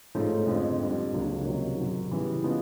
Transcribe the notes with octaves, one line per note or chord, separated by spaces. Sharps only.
G#2 F3 A3 C#4
F2 D3 F3 G#3
F2 D3 G3
C#2 C#3 F#3 A#3 D4
C3 D#3 F#3 A#3
F#2 C#3 F#3
C#3 E3 G3 B3 E4
C#3 F3 G#3 B3